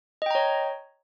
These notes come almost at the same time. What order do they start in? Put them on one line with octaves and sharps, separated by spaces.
D#5 G5 A#5 C#5